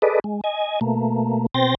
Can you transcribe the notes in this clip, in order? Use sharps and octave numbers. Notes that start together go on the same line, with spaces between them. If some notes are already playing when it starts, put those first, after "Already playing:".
G#4 A4 B4 D5 D#5
G#3
D#5 G#5
B2 A3 A#3
B2 C4 C5 G5 A6 A#6